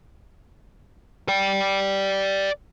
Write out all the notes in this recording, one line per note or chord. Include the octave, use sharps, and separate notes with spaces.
D5 G5